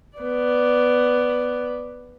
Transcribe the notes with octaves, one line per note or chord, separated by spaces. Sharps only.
B3 D5